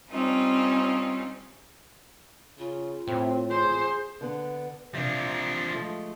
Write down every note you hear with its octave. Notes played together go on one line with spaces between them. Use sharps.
G3 C4 C#4 D#4 F4
C#3 F4
A2 C4
G#4 C5
D3 B3
C3 F3 D4
F3 G#3 A3